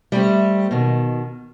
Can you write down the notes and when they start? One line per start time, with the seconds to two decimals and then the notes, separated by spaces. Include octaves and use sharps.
0.12 G3 A3 C4
0.71 B2 D#3